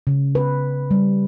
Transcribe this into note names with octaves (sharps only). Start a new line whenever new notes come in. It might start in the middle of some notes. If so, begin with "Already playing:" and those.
C#3
B4
G3